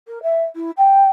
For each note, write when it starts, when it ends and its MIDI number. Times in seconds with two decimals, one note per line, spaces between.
0.08 0.22 70
0.22 0.43 76
0.55 0.70 64
0.77 1.09 79